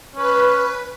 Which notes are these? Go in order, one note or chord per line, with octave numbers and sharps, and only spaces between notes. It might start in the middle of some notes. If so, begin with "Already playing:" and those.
C#4 B4